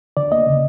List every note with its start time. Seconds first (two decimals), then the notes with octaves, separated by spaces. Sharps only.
0.17 D3 D5
0.32 A#3 D#5
0.47 C#3